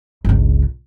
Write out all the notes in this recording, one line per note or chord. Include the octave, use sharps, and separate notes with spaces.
G1 C#2